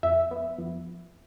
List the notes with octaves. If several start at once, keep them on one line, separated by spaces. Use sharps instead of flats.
F2 E5
B3
F2